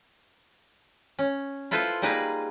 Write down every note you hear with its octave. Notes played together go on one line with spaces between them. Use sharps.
C#4
E4 F4 A4 B4 C5
G3 A#3 D#4 G#4 B4